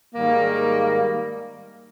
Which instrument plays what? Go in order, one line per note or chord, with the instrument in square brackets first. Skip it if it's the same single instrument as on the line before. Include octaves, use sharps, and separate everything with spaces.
[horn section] G#2 D#3 G3 A#3